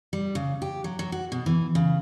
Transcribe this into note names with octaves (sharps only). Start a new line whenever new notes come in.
G3
C#3
G4
F#3
F#3
F#4
B2
E3
C#3